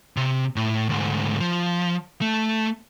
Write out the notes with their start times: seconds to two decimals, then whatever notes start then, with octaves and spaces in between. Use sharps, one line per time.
0.17 C3
0.56 A2
0.89 D2 G#2
1.40 F3
2.21 A3